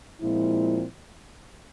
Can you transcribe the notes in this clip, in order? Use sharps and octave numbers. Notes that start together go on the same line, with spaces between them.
A#2 F3 G#3 C4 E4